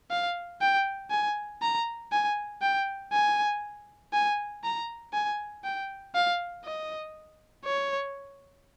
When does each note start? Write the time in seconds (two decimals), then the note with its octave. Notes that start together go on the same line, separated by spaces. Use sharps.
0.11 F5
0.61 G5
1.11 G#5
1.62 A#5
2.12 G#5
2.62 G5
3.13 G#5
4.13 G#5
4.64 A#5
5.14 G#5
5.64 G5
6.14 F5
6.65 D#5
7.65 C#5